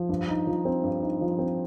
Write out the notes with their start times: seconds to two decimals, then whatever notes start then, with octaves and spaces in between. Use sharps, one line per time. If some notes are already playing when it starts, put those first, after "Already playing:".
Already playing: F3
0.09 G2
0.28 D#4
0.47 F3
0.65 C4
0.83 G2
1.02 D#4
1.21 F3
1.39 C4